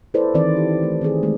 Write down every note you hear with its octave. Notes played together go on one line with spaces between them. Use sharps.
E4 A4 B4 C5 D5
D#3 E3 C4 D5
G4
A3
D#3 C4 G#4
G#3 A3